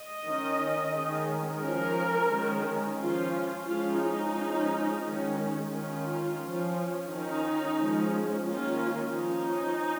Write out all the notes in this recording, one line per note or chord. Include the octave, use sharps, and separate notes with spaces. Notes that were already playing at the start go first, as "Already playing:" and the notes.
Already playing: D#5
D#3 C#4
D#3 G#3 C#4
F3 C#4 A#4
D#3 G#3 C#4
F3 C#4 F4
F3 G#3 C#4 F4
D#4
F3 G#3 C#4
D#3 G#3 C#4
D#3 C#4 F4
F3 C#4
D#3 C#4 D#4
F3 G#3 C#4
D#3 A#3 C#4 F4
F3 C#4 D#4